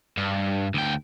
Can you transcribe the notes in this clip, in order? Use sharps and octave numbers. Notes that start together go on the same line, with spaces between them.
G2
D2 G5